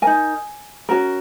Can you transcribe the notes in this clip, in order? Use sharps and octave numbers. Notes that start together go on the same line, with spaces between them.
D#4 A#4 G#5
C#4 F#4 A#4